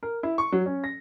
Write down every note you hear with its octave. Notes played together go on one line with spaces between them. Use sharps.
A#4
E4
C#6
F#3
C#4
A#6